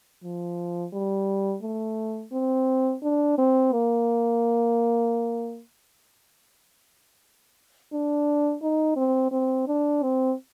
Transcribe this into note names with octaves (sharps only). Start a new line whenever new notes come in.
F3
G3
A3
C4
D4
C4
A#3
D4
D#4
C4
C4
D4
C4